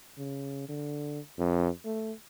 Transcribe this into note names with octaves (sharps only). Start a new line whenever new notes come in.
C#3
D3
F2
A3